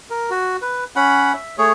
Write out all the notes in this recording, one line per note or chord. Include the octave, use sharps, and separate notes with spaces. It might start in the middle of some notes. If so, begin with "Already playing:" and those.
A#4
F#4
B4
C#4 F#5 B5
E5
A3 G#4 C#5